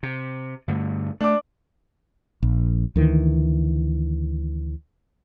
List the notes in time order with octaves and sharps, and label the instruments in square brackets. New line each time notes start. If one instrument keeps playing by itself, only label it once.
[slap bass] C3
G2 D3 A3
[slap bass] A3 [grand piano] D4 D6
[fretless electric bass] A#1
D2 D#3 E3